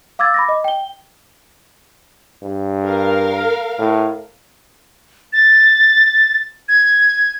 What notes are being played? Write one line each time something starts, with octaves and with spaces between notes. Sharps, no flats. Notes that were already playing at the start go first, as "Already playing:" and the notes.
F5 D6 E6 G#6 A6
B5 D6 A#6
D#5
G5 G7
G2
A#4 F5
A2
A6
G#6